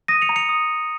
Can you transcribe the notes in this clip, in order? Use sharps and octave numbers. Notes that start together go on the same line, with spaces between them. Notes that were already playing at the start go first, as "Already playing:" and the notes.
D#6 A#6 D#7
C#7 F7
A#5
C#7 F7
D#6